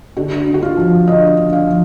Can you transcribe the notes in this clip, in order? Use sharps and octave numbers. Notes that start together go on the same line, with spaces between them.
D3 F#4
D3
F#4
F4
F3
D3 D#5
D3
F5
F3